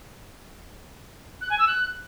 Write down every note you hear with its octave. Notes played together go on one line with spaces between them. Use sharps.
F#6
G#5
E6
F#6